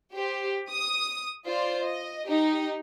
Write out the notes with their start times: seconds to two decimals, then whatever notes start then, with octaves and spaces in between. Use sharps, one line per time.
0.13 G4 C5
0.69 D#6
1.46 F4 C5 D5
1.84 D#5
2.28 D#4 G4